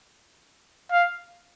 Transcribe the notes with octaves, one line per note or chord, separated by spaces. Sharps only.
F5